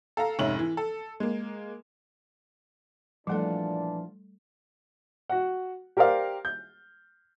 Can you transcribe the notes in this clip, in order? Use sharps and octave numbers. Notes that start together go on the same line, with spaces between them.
A4 F5 A#5
F1 G#2 C#4 E5 F#7
E3
A4
G#3 A#3
A#2 E3 F3 G3 A3 D4 A4 F#5
F#4 F#5
G4 A#4 C5 D5 F5
G6